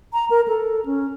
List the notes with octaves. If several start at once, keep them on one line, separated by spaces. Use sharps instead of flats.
A#5
A#4
A4
C#4